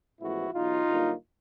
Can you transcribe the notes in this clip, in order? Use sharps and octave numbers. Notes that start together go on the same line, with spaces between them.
A1 A2 F3 G#3 B3 E4 F#4
E2 B2 F#3 D#4 F4
G2 D3 F#3 A#3